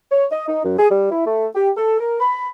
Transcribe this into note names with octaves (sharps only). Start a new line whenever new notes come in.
C#5
D#5
D#4
F#2
G#4
G3
E4
A3
G4
A4
A#4
B5